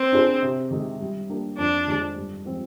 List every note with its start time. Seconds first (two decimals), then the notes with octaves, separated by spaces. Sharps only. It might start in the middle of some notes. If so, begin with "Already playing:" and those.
Already playing: C4
0.12 D4 G#4 C5
0.42 C3
0.71 D#3 G#3
1.00 G3
1.30 A#3 D4 G4
1.58 F2 D4
1.87 D#3 G#3 D#4 G#4
2.16 G2
2.45 F3 G#3 C4 F4